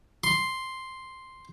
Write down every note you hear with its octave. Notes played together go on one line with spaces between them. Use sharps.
C6